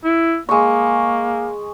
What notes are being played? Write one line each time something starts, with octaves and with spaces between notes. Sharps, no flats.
E4
G#3 A#3 C#6